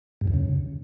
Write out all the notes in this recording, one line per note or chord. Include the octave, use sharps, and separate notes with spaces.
G2
E2
C#3